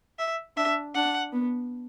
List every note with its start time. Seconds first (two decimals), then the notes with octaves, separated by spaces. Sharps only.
0.19 E5
0.57 D4 E5
0.94 D4 F#5
1.33 B3